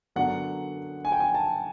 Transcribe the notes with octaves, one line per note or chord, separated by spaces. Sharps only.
F#2 D3 F#3 B3 D4 F#5
G#5
G5
G#5
A5